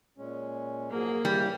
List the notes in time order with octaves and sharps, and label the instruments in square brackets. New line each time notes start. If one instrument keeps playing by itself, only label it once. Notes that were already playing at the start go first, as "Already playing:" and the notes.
[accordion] A#2 G#3 C#4
[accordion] G#2 F3 F#3 [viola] A#3 G#4
[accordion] G#2 C#3 E3 [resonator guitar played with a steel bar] G3